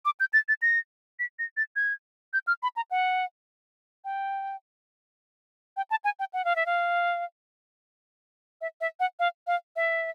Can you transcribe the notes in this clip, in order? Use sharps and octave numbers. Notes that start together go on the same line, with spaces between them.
D6
G6
A6
A6
A#6
B6
A#6
A6
G#6
G6
F6
B5
A#5
F#5
G5
G5
A5
G#5
G5
F#5
F5
E5
F5
E5
E5
F#5
F5
F5
E5